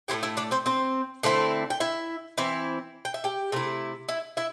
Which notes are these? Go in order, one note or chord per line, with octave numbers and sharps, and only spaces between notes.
A2 A3 C4 E4 G4 G5
E4 E5
D4 D5
C4 C5
C4 C5
D3 A3 C4 E4
G5
E4 E5
E3 C4 E4
G5
E5
G4 G5
C3 A3 E4
E4 E5
E4 E5